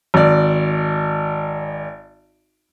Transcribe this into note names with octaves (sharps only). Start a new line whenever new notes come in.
G#1 D5